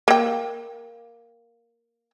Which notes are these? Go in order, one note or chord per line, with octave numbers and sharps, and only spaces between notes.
A#3 G5